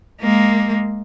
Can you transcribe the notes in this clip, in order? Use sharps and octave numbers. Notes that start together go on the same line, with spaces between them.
G#3 A#3